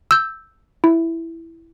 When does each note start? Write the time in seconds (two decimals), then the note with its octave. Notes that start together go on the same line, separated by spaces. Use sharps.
0.11 E6 G6
0.84 E4